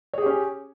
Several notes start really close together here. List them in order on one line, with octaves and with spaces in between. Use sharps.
C#5 G#4 G4 C#4